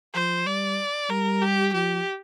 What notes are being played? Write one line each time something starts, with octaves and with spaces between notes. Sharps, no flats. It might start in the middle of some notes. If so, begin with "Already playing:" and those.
F3 C5
G3 D5
G3 A#4
G4
F3 G4